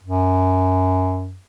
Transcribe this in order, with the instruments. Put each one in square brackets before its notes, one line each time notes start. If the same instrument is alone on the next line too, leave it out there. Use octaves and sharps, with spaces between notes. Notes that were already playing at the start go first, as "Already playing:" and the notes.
[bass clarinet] F#2